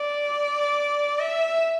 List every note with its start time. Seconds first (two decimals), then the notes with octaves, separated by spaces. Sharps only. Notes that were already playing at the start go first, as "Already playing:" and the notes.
Already playing: D5
1.20 E5